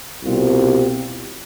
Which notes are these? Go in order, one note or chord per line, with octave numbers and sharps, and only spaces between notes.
C2 B2 G3 C4 F4